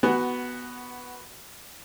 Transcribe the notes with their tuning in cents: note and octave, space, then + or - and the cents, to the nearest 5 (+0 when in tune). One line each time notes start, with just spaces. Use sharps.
B3 +0 F#4 +15 G#5 -10